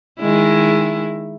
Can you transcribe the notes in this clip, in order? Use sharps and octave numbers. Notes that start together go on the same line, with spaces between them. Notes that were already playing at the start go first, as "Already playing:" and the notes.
D#3 G#3 E4